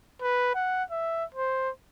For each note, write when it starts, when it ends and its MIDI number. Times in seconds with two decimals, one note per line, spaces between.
0.22 0.54 71
0.55 0.84 78
0.91 1.24 76
1.34 1.70 72